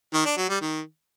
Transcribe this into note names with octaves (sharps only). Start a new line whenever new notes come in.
D#3
D4
F#3
G3
D#3